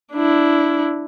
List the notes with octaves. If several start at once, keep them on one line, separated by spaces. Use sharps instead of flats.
D4 E4